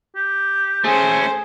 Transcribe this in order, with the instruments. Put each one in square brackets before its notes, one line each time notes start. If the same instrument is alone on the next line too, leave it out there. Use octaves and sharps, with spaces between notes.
[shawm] G4
[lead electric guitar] A3 C#4 [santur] G#4 [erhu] C5